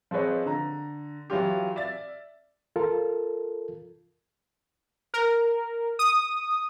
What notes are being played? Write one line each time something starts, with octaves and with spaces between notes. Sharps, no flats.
F3 C4 G#4 B4 C#5 D#5
D3 A#5
E3 F#3 F4 G4
D5 E5 A6
F4 A4 A#4
A#4
D#6